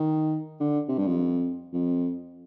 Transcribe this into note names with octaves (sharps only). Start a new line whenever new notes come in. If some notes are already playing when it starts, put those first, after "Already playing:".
Already playing: D#3
D3
C3
G2
F2
F2